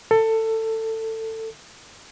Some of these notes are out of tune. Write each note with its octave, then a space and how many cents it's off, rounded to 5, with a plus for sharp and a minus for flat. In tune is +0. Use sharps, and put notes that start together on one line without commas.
A4 +20